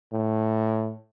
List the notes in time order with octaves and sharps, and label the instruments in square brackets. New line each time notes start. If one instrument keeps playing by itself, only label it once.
[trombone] A2